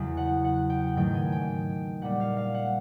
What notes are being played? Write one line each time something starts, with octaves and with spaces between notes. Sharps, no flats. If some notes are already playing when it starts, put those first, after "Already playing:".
Already playing: E2 C#3 F#3 A#3
F#5
F#5
G5
G#2 D#3 F#3 A3 G5
G#5
G5
A#2 G3 A#3 F#5
F5
F5
F#5